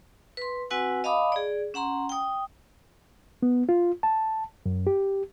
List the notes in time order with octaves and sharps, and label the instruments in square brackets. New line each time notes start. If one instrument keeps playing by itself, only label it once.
[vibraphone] B4 C6
C4 F#4 B4 F#5 G#5 E6
D#5 F5 A5 B5 D6 D#6
G#4 D5
C#4 F#5 A#5 C6
G5 D#6
[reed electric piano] B3
F4
A5
F#2
G4